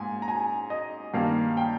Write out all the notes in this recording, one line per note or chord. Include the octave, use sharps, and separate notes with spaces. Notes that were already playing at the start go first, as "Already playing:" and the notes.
Already playing: G#2 A#3 G#5
A#5
G#5
D#5
G2 D#3 A#3 F5
G5